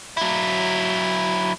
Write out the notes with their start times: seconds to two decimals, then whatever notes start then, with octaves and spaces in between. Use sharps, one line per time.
0.17 F#3 E4